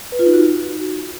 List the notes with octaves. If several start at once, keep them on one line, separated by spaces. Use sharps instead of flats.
B4
F4
D#4
F#4